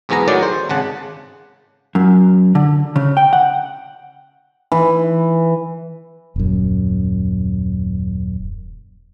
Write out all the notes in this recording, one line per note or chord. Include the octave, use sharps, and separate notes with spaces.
B1 E2 G#2 B3 G#4 A#5
A2 D#3 F#3 G#4 D5
C5
G#1 C#3 F#5 A5
F#2
D3
C#3
G5
F#5
E3
D#1 F#2